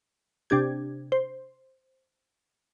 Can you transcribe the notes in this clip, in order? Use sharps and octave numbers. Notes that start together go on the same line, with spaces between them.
C3 D4 G4 G#6
C5